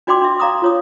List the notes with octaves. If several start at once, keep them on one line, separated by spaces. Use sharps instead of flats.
D4 F#4 D5 G5 C6 D6
D4 E5
D5 F5 A#5 D6 D#6
F4 C#5 D#6